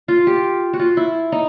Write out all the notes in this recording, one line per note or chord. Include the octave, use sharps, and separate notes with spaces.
F4
G4
F#4
F4
E4
D#4